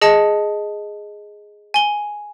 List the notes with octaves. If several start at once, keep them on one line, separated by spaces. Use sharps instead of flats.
G#4 D#5 A5 C#7
G#5 G7